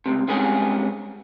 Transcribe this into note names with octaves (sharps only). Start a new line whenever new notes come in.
C#2 F#2 C3
G2 C3 G#3 B3 C#4 G#4